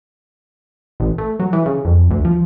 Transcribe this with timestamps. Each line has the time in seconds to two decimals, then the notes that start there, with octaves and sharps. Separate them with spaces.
1.00 A1
1.18 A3
1.40 F#3
1.53 E3
1.66 C#3
1.85 F2
2.11 D2
2.25 F3